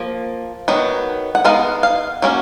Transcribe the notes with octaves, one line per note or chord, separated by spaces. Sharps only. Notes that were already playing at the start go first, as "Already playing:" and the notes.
Already playing: F3 A#3
D#3 F#3 B3
F#5
G#3 B3 D#4 F5
F5
F#3 A#3 C#4